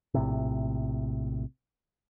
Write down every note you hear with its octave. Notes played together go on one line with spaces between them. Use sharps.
A#1 A2 C3